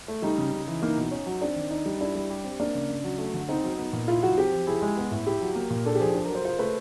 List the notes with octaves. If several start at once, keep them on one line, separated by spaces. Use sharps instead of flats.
A3
G3 D#4
C#3
C#3
E3
A#3 D#4
B2
C#4
F#3
C4 D4
D#3
D#4
G3
D4 E4
G3
G4
C4
A#3 D4
C#3
C#3
F#3
A3
D3
C4 D#4
F#3
B3
A#2
E4 F4
F#3 F#4
C4 G4
F3
E4 G#4
G#3
B3
A2
E4 G4
F#3
A#3
A#2
D4 A4
G4
F3 G#4
D4 A4
A#4
F#3
C5
F4 C5
A3 B4